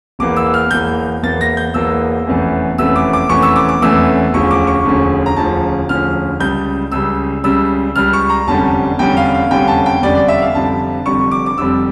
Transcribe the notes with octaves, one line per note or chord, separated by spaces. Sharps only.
E1 E2 E3 A#3 D6
E6
F6
E1 E2 E3 A#3 G6
E1 E2 E3 A#3 A6
A#6
G6
E1 E2 E3 A#3 E6
F1 E2 E3 A3 C#4
F1 E2 E3 A3 C#4 E6
D6
D6
F1 E2 E3 A3 C#4 C#6
E6
D6
D6
F1 E2 E3 A3 C#4 E6
E1 D2 D3 F3 C#4 C#6
D6
C#6
E1 D2 D3 F3 C#4
A#5
E1 D2 D3 F3 C#4 A5
E1 D2 D3 F3 C#4 F6
C#2 C#3 G3 G6
C#2 C#3 G3 E6
C#2 C#3 G3 E6
C#2 C#3 G3 F6
C#6
A#5
F1 E2 D3 G3 C#4 A5
F1 E2 D3 G3 C#4 G5
F5
F5
F1 E2 D3 G3 C#4 G5
A5
G5
F1 E2 D3 G3 C#4 D5
D5
E5
F5
F1 F2 D3 G3 A5
F1 F2 D3 G3 C#6
D6
D6
F1 F2 D3 G3 E6